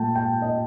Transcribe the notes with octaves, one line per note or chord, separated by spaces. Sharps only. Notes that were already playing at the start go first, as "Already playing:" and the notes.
Already playing: A#2 A3 G5 A5
G5
D#5